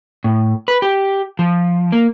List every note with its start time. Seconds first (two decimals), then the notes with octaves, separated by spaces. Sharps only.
0.24 A2
0.68 B4
0.82 G4
1.39 F3
1.92 A#3